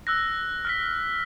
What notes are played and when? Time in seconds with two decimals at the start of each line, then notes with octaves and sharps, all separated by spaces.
0.07 E6 F#6 A#6
0.65 F6 A#6 B6